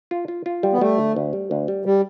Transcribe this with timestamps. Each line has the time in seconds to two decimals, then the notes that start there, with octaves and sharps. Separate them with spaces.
0.11 F4
0.28 F4
0.46 F4
0.63 G3
0.73 B3
0.81 G3 A3
0.98 D3
1.16 D2
1.33 G3
1.51 D2
1.68 G3
1.85 G3